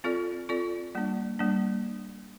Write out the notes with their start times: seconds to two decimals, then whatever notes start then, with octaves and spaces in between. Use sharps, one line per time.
0.04 C4 F4 A4 D5
0.49 C4 F4 A4 D5
0.95 G3 A#3 D4
1.39 G3 A#3 D4